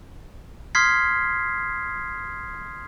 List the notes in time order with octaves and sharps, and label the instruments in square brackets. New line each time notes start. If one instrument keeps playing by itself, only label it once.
[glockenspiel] C6 D#6 F6 G#6 B6 C7